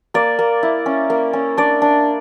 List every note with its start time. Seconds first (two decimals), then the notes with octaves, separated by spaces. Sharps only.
0.14 A#3 D5
0.39 A#3
0.63 E4
0.86 C#4
1.10 A#3
1.33 C#4
1.57 D4 D5
1.82 D4